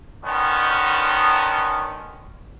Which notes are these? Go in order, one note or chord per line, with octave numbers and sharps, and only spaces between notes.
D3 D#3 B3 C#4